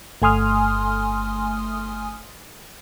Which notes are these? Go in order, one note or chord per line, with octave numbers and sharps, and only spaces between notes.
G1 A3 G#5 C6 D#6 F6